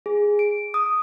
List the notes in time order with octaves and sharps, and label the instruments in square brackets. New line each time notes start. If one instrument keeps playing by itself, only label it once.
[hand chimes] G#4
D7
D#6